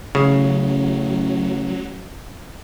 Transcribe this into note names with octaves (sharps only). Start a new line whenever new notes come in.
A1 C#3 F#3